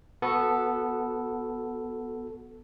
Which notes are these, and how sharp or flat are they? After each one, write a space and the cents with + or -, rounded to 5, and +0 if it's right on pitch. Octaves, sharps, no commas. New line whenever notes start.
B3 -5 F#4 -10 A4 +0